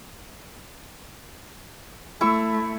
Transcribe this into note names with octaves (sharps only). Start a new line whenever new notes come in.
A3 E4 C#6 E6